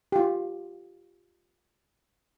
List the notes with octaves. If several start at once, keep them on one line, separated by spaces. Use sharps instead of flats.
F4 G4